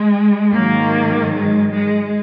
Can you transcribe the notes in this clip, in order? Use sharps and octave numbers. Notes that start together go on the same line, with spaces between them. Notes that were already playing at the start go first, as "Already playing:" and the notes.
Already playing: G#3
G#2 D#3 F#3 A#3
G#3
G#3